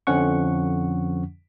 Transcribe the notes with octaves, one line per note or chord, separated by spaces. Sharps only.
F2 D3 F3 C#4 F#5 C#6